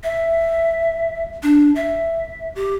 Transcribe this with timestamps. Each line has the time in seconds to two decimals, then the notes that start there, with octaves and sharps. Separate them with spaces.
0.03 E5
1.43 D4
1.76 E5
2.55 G4